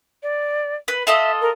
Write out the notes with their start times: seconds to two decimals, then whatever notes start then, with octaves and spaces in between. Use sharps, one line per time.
0.23 D5
0.88 B4
1.07 F4 A4 D#5 E5
1.41 A#4